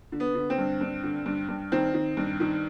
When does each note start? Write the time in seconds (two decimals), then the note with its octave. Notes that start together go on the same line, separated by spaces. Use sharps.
0.12 D3
0.20 B3
0.35 D3
0.50 C4
0.58 G2
0.81 G2
1.03 D3
1.26 G2
1.49 G2
1.72 D#3 C4
1.94 D#3
2.17 G2
2.40 D#3